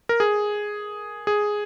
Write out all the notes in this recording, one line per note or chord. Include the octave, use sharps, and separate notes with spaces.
A#4
G#4
G#4